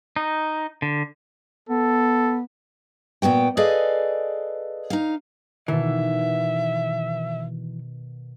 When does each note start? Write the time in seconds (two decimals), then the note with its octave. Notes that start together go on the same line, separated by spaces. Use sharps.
0.16 D#4
0.82 D3
1.69 B3 A4
3.22 A#2 B3 F#4 G5
3.57 G#4 A4 B4 D5 D#5 F5
4.90 D#4 F5
5.68 B2 D#3 E3 E5